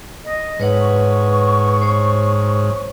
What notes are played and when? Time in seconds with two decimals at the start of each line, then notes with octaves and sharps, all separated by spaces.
0.24 D#5
0.59 G#2 B4 C#5 F#5
0.81 C#6
1.82 C5 C#5